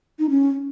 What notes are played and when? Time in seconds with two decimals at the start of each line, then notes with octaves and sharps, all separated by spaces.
0.19 D#4
0.30 C#4